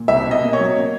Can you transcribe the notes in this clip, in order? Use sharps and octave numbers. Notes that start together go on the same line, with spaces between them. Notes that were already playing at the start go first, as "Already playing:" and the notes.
Already playing: A#2
C2 E5
B2
D#5
A#3
C#5
F#3
A#3